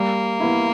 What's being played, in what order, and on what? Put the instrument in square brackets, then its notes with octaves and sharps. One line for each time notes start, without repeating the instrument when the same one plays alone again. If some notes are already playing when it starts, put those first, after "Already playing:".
Already playing: [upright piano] G3 [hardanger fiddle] A#3
[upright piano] B3 E4